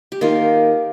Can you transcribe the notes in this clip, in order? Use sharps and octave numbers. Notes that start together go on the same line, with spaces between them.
G4
D#3 A#3 F4